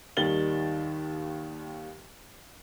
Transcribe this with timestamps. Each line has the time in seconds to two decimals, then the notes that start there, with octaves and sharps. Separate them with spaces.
0.17 D#2 D#3 G3 A6 F#7 G7